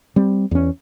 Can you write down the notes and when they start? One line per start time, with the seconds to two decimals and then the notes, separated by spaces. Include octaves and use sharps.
0.16 G3 C4
0.51 E2 C#4